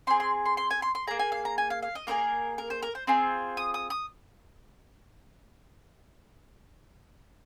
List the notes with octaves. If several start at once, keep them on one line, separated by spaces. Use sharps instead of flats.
C4 G#4 C6
C6
C6
C6
G#5
C6
C6
A#3 G#4 A#5
G#5
F5
A#5
G#5
F5
F5
D#5
A#3 D#4 G#4 A#4
A#4
C5
A#4
C5
C4 F4 G#4 C5
D#6
D#6
D#6